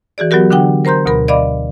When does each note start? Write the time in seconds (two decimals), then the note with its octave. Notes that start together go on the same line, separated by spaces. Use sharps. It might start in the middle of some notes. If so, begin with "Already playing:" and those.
0.18 E3 F#4 G#4 D5
0.31 F#3 B3 F#4 G4 A#4
0.50 D3 D4 F#5 G5
0.85 A#4 C5 A#5 C6 G6
1.05 D2 B2 A#4 B5
1.28 D5 D#5 F5 B5 D6